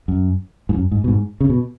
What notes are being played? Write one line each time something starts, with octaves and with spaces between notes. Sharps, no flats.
F#2
G#2
F#2
G#2
B2
G#2
C#3
B2